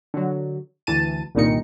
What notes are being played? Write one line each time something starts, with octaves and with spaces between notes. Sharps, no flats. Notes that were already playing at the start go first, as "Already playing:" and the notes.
D3 F#3
D2 E3 A5 D#7
C2 G2 A#2 D#3 D#4 C#7